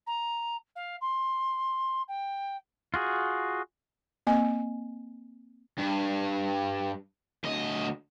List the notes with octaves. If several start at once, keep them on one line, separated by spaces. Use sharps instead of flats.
A#5
F5
C6
G5
F4 F#4 G#4
A#3 C4 D#5 G#5
G2
D2 D#5